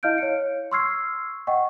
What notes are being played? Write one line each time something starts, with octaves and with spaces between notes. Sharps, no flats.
E4 D#5 F5 F6 G6 D7
C#5 C#7
C6 C#6 E6 F6 G#6 C7
D#5 F#5 G5 C#6